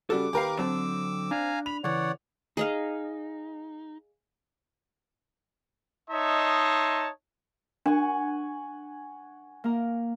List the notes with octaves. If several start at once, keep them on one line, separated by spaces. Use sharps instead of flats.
C#3 G3 F#4 A4 D6
D#2 G4 A#4 B4 F5
D3 F#3 C4 A5 D6 E6
D4 F5 G#5 A#5
B5 F7
C#3 E3 C#5 D5 F#5
D#4 G#4 D#5 F5
D#4 C#5 D#5 E5 A5 C6
D4 F#5 G#5 C#6
A#3 A#4